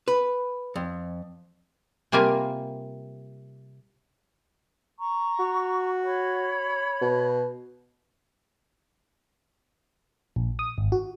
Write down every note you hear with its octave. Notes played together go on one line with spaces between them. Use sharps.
B4
F2
C3 G3 A#3 F4 G#5 A#5
A#5 C#6
F#4
C#5 B5
B2
A#1
D#6
G#1
F#4